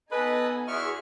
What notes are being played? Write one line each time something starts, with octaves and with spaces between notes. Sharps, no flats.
B3 D#4 A4 B4 D#5 G#5
E2 F#4 G#4 E5 C#6 F6